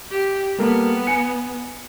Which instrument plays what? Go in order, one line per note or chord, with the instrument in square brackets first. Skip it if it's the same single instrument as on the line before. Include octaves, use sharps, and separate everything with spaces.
[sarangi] G4
[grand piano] G3 A#3 A4 [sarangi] B3
[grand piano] G#5 C#7